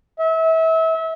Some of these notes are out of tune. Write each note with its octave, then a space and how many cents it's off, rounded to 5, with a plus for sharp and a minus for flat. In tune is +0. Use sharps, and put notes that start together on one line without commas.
E5 -30